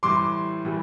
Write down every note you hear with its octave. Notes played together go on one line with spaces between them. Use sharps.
A2 E3 G3 C6 D6
A2 E3 G3